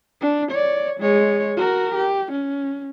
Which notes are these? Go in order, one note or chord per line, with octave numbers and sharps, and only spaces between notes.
D4
C#5 D5
G#3 C#5
F#4 A#4
G4
C#4